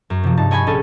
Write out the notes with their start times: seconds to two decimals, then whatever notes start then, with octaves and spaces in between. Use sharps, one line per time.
0.10 F#2
0.24 C3 F3
0.37 G2 D#4 A5
0.51 C#5 D#5 G#5 B5 G#6
0.67 A#1 C#4 A4 D#5 G#6 A6